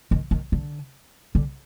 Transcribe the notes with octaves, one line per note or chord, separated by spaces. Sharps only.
D#3
D#3
D3
D3